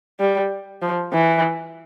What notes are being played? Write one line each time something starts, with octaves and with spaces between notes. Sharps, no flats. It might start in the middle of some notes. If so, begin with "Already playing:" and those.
G3
F3
E3